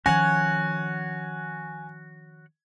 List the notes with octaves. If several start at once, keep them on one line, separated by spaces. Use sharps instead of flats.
D#3 F3 C#4 F#4 C#5 F#5 G#5